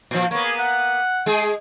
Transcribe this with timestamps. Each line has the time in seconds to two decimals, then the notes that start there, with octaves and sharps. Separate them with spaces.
0.11 A#2 F3
0.31 A#3 B3 C#5
0.44 G#4
0.59 F#5
1.26 G#3 G#4